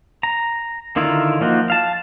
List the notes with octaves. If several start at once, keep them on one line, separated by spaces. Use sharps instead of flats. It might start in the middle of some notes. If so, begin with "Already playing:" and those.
A#5
D3 D#3 E4 F4 A#4
F3 A#3 D#4 F#4
F5 A5